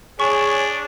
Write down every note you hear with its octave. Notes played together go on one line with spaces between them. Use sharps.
D4 G#4 C#5 C#6